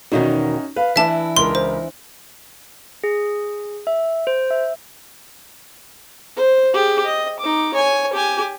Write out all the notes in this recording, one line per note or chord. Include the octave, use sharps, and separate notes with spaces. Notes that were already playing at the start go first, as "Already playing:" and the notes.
E2 B2 D#3 C#4 D#4 F#4
B4 F5
E3 D4 E4 E5 A5
C#2 A#4 C6
C5
G#4
E5
C5
E5
C5
G4 G#4
D#5
D#4 D6
C#5 G#5
G4 G#5